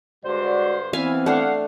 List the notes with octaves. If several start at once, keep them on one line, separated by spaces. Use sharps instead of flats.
G2 D3 G#3 F#4 C5 D5
E3 B3 C4 E5 F5 G#5
A3 D4 F5 F#5